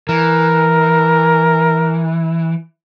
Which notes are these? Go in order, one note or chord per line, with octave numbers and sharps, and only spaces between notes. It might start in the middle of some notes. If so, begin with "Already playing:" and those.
E3 A#4